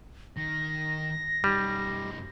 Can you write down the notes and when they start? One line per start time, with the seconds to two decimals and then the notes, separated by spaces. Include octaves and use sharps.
0.37 D#3 A#6
1.44 F#2 G3 D#4